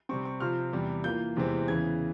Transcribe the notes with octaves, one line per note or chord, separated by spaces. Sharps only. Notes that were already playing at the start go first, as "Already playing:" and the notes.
C3 G3 C4 C#6
C#6
C3 F3 C4 F4 F6
E2 C3 G3
E3 A#3 F4 G6
E2 C3 E3 G#3 C4
E2 C#3 E3 G#6